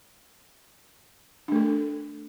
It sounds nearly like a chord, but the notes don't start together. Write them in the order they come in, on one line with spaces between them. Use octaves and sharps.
D4 A3 A4